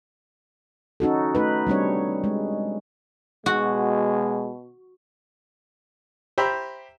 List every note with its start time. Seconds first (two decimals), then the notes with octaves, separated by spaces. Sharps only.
1.00 C#4 D#4 F#4 A4
1.35 A3 D#4 B4
1.67 G3 C4 D4 C#5
2.24 G#3
3.46 B2 G#3 F#4
6.38 G4 C5 E5 G5 A#5 B5